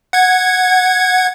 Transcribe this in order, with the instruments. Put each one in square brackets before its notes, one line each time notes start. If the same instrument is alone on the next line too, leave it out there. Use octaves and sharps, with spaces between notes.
[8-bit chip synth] F#5 G#6